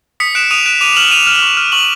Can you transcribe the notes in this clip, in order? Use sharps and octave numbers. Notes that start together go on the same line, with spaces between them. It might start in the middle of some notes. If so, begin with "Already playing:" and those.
D#6 B6 C#7
F#6 D7 E7
D#6 D#7 F7
F#6 D7 E7
D6 D#7 F7
F7
F6 E7 F#7
D6 D#7 F7
F6
C#6
F6
C#6 F#7